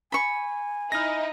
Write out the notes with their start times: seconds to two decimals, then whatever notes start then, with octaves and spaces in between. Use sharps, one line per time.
0.12 G#5 B5 C#6
0.92 D#4 E4 F6 A#6